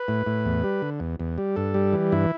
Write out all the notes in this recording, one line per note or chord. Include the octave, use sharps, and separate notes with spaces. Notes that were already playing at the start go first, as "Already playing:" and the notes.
Already playing: B4
A2
A2
E2
G3
D3
E2
E2
G3
G2 A4
G3
E3
G2 E4